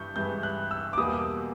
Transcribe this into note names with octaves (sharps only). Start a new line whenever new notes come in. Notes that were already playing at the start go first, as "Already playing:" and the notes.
Already playing: G2 E3 C#6 G6
G2 E3 G#3 G6
F#6
E6
D6
E2 B2 G3 A#3 D#6